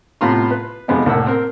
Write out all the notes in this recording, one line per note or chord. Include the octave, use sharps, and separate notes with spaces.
A2 C3 B3 F4 A#5 C6
B4
F2 C3 G#3 B3 C4 D#4
C2 A2 A#3 F#5 E6
C4 A#4